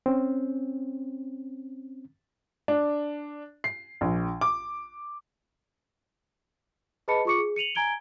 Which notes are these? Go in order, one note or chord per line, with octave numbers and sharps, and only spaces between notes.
C4 C#4
D4
C7
A#1
D6
G#4 B4 D#5 A5 B5 C#7
F4 G#4 C#6 D6 C#7
G#4
C#7 D#7 F7 F#7
G#5 A#5 G#6 D7 G7